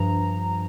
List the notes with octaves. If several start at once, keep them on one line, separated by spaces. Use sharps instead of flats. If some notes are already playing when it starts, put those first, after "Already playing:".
Already playing: G2 F3 A#5